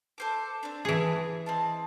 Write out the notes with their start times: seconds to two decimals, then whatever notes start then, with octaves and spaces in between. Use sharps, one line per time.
0.18 A4 C5 D6
0.63 C4 D4
0.85 E3 G#4
1.46 C4 D#5 A5